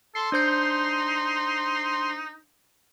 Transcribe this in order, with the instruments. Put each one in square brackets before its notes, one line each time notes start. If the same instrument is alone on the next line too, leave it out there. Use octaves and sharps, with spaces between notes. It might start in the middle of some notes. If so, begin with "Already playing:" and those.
[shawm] A4 [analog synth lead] C6
[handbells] D4 C5 G6 [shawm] D#4